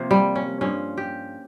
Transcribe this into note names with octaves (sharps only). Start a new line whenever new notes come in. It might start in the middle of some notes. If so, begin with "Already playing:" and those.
Already playing: C3 F3 A#3
G3
C#4
G2 F3 C#4
G4